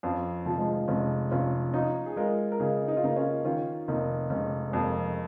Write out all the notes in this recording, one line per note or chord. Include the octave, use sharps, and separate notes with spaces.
F2 C#4 F4
F1 F3
G#3
F3
F1 G#3 C#4
F1 C#4 F4
C#4 D#4 F4
G#4
G#3 F4 A#4
A#4
C#3 D#4 G#4
D#4
F4
C#3 A#3 D#4
C#4 F4
D#3 C#4 F4
F1 A#3 D#4
F1 G#3 C#4
G#3
F2 F3 A#3